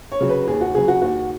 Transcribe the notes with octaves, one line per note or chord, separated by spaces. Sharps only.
C#5
C#3 F#3
B4
D#2 G#4
F#4
C#3 F#3 G#4
F#4
D#2 F#4